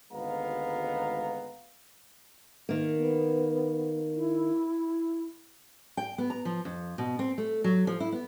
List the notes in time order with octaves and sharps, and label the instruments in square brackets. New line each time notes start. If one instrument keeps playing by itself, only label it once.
[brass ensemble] G#1 D2 G#3 B3 F5 A#5
[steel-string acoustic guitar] D#3 A#3
[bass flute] B3
E4
[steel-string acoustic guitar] G5
B3
A#5
F3
F2
B2
C4
A3
F#3
F3
E4
B3